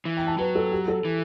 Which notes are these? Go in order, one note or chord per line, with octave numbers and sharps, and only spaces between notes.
E3
G5
A5
F#3 B4
A4
G4
A4
E3